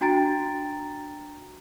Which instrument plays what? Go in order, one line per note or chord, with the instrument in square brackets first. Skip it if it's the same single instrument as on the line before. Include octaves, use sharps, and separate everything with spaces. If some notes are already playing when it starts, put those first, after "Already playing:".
[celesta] D4 F#4 G5 A#5 A6 D7